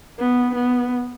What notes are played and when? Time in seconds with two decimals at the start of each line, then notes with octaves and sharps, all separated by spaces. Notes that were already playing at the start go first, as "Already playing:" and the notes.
0.19 B3
0.55 B3